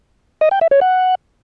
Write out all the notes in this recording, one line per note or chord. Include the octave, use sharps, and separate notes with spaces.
D#5
G5
E5
C#5
F#5